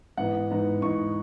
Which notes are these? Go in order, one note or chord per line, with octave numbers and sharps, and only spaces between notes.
G#2 E3 B3 D#4 F#5
G#2 E3 B3 D#4
G#2 E3 B3 D#4 C#6